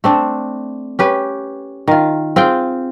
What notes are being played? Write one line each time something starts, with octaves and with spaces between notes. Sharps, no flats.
A3 C4 D4
C#4 G4 B4
D#3 F4
C4 F4 G#4 G5